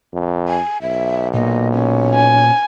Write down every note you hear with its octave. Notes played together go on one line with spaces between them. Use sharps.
F2
G#5
B1 E5
A#2 D#5
C#4
G#5